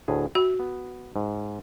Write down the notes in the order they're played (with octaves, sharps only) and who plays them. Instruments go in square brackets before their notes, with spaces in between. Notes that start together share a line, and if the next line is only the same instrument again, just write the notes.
[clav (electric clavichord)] D2 A2 G#4
[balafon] F#4 [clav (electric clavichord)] E5
[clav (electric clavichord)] B3
G#2